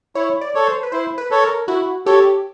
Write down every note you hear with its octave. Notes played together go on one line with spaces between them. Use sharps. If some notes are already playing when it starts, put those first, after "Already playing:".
E4 C#5
D5
A4 C#5
C5
B4
E4 C5
B4
A4 C#5
A#4
E4 F#4
G4 A4 C#5